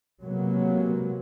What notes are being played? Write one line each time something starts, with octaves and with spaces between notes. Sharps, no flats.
C3 F#3 G#3 A#3 B3